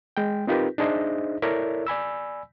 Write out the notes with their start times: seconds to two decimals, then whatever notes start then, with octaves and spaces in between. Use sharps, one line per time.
0.17 G#3 G5
0.47 C4 D#4 F4 G4 A#4 B4
0.78 D4 D#4 G#4 C5 D#5 E5
1.42 E4 A4 A#4 C#5 D5 E5
1.87 D5 G#5 B5 E6